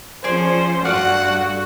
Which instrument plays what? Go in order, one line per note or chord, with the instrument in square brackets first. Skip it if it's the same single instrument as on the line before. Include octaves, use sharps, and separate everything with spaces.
[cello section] F3 C#4 [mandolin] G#4 D5 G#5 [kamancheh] C5
[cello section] G2 [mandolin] A3 D5 F5 [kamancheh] F#4 [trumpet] F#5